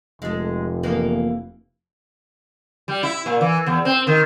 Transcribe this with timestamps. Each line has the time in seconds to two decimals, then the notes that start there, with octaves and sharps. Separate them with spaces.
0.22 F1 G#3 A4
0.83 E3 A#3 B3
2.88 G3
3.03 E4
3.26 A#2
3.41 E3
3.66 E2
3.85 C4
4.07 D#3